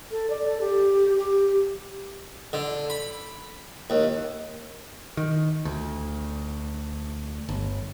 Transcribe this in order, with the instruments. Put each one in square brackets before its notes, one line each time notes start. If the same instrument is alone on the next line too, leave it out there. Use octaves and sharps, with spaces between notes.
[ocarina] A4
D5
A4
G4
G4
[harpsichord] D3
B5
D#2
[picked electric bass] D#3
D2
G1